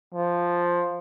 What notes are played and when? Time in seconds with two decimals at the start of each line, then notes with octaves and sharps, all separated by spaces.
0.14 F3